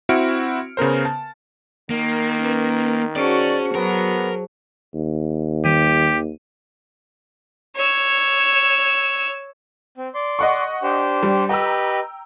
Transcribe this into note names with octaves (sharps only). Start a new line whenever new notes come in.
C4 E4 F#4 F6 C#7 D7
C#3 B3 A#4 C5
A5
D#3 A#3
C#4 B4
C#4 F#4 G#4 C5 D5 A5
F#3 B3 A#4
D#2
D#3 G4 D#7
C#5 E6
C4
D5 C6
D#5 F#5 C#6
D4 G4 C5
G3
G4 B4 D#5 G5 A#5 E6